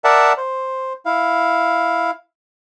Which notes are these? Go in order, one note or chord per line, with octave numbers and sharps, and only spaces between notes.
A#4 D5 E5 F#5 A5
C5
E4 F5